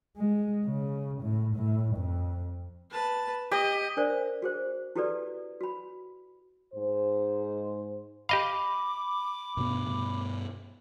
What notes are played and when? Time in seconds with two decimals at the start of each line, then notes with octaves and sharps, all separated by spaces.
0.17 G#3
0.65 C#3
1.22 A2
1.56 A2
1.96 F2
2.90 B4 A5
3.51 G4 D#5
3.97 D4 A#4 C5 D5
4.42 F#4 G#4 C5
4.96 E4 F#4 G4 A4 B4 D5
5.61 F#4 B5
6.73 G#2 C5
8.29 G4 D#5 F5 B5 D6
9.57 G2 B2 B3